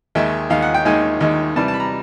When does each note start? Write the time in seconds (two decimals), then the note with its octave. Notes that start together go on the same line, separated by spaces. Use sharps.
0.15 D#2 D#3 G#3 E5
0.50 D#2 D#3 G#3 F5
0.62 F#5
0.74 G5
0.85 D#2 D#3 G#3 G#5
1.21 D#2 D#3 G#3
1.56 C3 E3 G3 A5
1.68 A5
1.74 B5
1.80 A#5